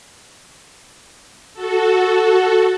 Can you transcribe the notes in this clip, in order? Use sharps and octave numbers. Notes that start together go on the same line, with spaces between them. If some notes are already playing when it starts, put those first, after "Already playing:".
F#4 A4